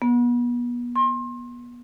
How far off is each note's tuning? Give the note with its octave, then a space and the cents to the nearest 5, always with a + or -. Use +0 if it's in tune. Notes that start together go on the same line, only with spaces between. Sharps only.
B3 -35
C6 +30